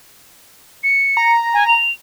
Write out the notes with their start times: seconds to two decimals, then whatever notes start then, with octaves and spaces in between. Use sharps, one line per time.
0.83 C#7
1.17 A#5
1.54 G#5
1.68 F7